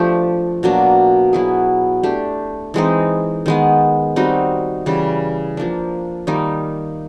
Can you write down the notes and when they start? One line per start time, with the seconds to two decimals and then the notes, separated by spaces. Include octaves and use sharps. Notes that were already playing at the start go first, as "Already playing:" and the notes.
Already playing: F3 A3 D4 G4
0.63 B2 F#3 A#3 D4
1.33 F#3 B3 E4 G#4
2.03 A3 D4 G4
2.74 E3 G#3 C4 D#4
3.46 D#3 G#3 B3
4.16 G3 C4 D#4 F#4
4.86 C#3 E3 G3
5.57 F3 A#3 D4
6.27 D#3 G3 A#3 D#4